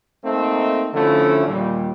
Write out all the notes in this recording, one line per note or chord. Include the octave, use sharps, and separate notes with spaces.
A3 A#3 C4 D#4
D3 F3 A3 C#4 E4
D#2 A#2 G3